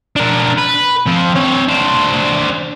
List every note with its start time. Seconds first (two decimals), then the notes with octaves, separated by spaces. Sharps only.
0.16 D4 A#4
0.58 B4
1.06 F3 C4
1.35 C4 C#5
1.68 D4 C5